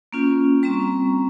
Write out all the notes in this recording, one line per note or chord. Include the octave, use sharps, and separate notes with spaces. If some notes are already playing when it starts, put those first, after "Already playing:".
A#3 C#4 F4
G3 C4 A#5 C#6